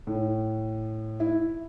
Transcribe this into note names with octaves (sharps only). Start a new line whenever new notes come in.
A2
E4